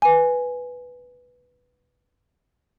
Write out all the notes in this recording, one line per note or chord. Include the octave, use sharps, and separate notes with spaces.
B4 G#5